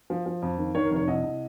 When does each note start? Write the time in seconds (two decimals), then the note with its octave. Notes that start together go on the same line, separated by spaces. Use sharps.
0.10 F3
0.26 F3
0.42 F2
0.58 D#3
0.75 D#3 C#5
0.85 A#4
0.91 F1
0.96 C#5
1.07 C2 D#5
1.23 C2